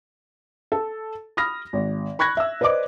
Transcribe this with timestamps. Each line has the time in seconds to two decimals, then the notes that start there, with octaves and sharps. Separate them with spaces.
0.72 A4
1.37 B5 D#6 F6 A#6
1.73 G#1
2.19 B5 C#6 F#6 G#6 A#6
2.37 E5 E6
2.61 B4 C5 D5 D#5 D6